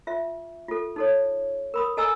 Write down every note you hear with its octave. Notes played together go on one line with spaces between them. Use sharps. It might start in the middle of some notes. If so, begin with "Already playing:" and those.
F4 E5
F4 A4
D#4 A4 C#5
A#4 B5 D#6
A4 D#5 G#5 A#5 E6